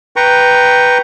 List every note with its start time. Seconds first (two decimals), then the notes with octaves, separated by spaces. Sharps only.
0.16 B4 G5 A#5 C#6